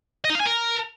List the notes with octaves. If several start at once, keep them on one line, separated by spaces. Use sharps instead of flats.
D#5
D#4
F5
G#5
A#4